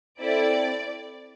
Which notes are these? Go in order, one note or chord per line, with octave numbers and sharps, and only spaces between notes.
C4 E4 A4 D5